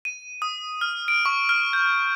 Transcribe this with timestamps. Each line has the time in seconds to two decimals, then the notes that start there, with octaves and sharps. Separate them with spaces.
0.05 D#7
0.42 D#6
0.81 F6
1.08 D7
1.26 C#6
1.49 F6
1.73 G6